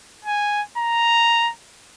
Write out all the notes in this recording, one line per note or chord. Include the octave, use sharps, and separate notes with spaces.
G#5
A#5